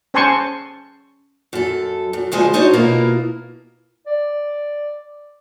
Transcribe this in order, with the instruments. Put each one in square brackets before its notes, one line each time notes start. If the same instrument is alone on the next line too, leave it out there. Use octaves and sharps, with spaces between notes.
[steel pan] C#4 C5 G#5 A5 C6 C#6
[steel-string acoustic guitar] F#2 A4
F#2
D2 G2 F3 G#3 G#5
D4 D#4 F#4 C5 C#5
B2 A#3 E4 F4 A#4 D#5
[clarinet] D5